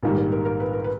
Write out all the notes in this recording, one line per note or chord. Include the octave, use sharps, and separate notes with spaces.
A#1 G#2 D#3 G3 A#4
A#4
A#4
A#4
B4
A#4
B4